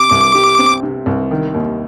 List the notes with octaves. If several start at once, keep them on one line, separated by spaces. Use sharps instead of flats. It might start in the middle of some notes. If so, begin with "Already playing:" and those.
Already playing: C3 D6
C2
G3
C4
C3
C2
D#3
D#2